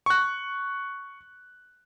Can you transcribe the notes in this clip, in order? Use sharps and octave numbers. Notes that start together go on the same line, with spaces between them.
C#6 F#6